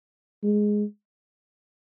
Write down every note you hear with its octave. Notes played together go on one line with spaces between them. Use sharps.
G#3